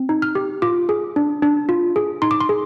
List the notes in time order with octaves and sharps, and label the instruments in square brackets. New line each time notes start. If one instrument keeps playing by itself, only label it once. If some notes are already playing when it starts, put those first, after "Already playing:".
Already playing: [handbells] C4
D#4
F6
G4
F4 D6
G#4
D4
D4
F4
G#4
D#4 C6
D6
C6
G#4